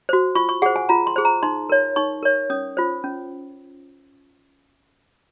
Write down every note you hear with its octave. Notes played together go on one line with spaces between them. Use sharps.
F#4 C5
F4 C#6
C#6
G#4 C5 F#5
G#5
F4 A#5
C6
G#4 C5
A#5
D#4 C6
A#4 C#5
D#4 C#6
A#4 C#5
C#4 D#6
F4 C5
C#4